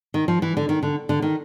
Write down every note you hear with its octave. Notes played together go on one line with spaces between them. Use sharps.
D#3
F3
E3
D3
D#3
D3
D3
D#3